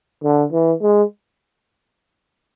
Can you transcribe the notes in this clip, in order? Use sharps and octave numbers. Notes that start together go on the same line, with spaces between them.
D3
E3
G#3